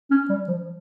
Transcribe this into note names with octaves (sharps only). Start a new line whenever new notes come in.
C#4
G3
F3